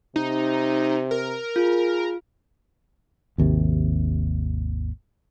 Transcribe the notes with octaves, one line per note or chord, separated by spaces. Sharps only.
C3 D#4
A#4
F4 G#4
G#1 D#2 C3